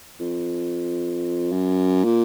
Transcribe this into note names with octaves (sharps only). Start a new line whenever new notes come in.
F2
F#2
A#2